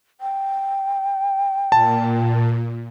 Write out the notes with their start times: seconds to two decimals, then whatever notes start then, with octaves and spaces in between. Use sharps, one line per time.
0.21 G5
1.72 A#2 A5